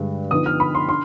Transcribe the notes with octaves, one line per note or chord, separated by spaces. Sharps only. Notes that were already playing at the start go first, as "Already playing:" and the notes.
Already playing: G2 D3 G#3 D4
D3 F3 B3 D#4 D#6
F6
B5
C6
D4 C6